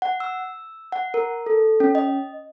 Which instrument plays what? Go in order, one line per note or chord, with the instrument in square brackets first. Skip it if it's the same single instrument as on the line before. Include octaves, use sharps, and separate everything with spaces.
[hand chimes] F#5
E6
F#5
A#4
A4
C#4
D#5